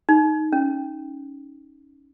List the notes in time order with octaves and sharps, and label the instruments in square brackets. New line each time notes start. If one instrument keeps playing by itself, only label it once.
[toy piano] D#4
C#4